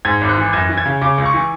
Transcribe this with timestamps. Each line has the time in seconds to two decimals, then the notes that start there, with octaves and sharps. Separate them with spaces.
0.05 G#2 G#6
0.21 G#1
0.29 F#6
0.37 E3
0.53 F#2 G#6
0.69 E3
0.77 G#6
0.86 C#3
1.01 C#3 D6
1.18 C#2
1.26 C#6
1.34 E3